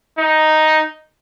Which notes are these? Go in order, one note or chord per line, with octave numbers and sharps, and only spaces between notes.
D#4